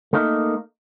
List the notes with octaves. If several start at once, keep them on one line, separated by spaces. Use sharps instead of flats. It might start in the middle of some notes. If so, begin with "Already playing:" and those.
A3 A#3 D#4 A#4